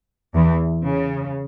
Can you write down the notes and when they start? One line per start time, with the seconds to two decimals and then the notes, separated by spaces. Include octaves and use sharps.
0.35 E2 E3
0.84 C#3